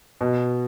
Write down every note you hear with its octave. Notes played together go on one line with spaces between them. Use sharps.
B2